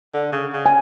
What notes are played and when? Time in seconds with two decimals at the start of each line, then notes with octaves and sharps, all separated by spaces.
0.14 D3
0.32 C#3
0.53 C#3
0.66 G#5